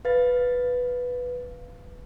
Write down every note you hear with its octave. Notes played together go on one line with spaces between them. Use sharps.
B4 F5 A6